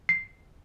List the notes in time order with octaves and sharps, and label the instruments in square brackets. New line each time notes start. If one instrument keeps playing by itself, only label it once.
[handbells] C7